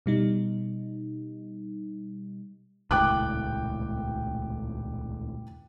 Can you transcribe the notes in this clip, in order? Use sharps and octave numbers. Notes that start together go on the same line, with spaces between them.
B2 G3 D#4
D#1 C#2 A2 G5 D6 F#6